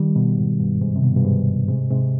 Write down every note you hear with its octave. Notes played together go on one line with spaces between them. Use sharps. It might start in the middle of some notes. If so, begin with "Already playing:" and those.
Already playing: D#3 G3
B2
G#2
G2
G#2
C3
B2
G2
G#2
G#2 C3
G#2 C3